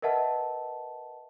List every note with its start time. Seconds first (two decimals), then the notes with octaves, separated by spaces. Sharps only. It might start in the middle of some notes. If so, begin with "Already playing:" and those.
0.02 A#4 B4 D#5 E5 F#5 A5